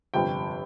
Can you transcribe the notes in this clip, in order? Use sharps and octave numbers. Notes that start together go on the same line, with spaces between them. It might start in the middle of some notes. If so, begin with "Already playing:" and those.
G1 F2 C3 G5